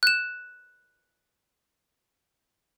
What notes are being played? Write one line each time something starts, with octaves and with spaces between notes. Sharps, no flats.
F#6 E7